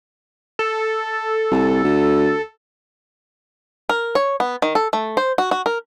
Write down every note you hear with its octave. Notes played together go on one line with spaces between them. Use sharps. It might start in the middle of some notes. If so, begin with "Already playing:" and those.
A4
C2
D2
A#4
C#5
B3
D#3
A4
A3
C5
F#4
F#4
A#4